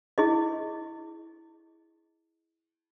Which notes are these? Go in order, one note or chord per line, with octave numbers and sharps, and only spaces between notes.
E4 G#4 D#5